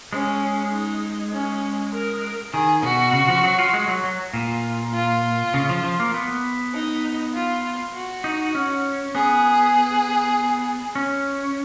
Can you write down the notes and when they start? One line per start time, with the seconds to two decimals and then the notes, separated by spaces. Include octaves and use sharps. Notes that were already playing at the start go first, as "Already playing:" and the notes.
0.13 G#3 C#4
0.72 D#4
1.33 C#4
1.93 A#4
2.53 D#3 G#4
2.83 B2 F#4
3.13 C#3
3.28 F3
3.44 F#3
3.59 F4
3.73 G#3
3.88 F#3
4.04 F#3
4.33 A#2 F4
4.93 F4
5.54 C#3
5.69 F3
5.83 F3
6.00 A#3
6.14 B3
6.74 D#4
7.34 F4
7.94 F#4
8.24 D#4
8.55 C#4
9.15 B3 G#4
10.95 C#4